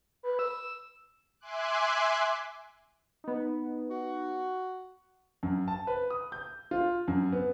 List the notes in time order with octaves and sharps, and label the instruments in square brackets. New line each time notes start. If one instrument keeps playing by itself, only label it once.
[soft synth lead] B4
E6
[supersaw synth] E5 G#5 C6 D6 F#6
[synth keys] B3 D#4
[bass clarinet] F#4
[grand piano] F#2
A5
B4
D#6
G6
F4
F#2
B3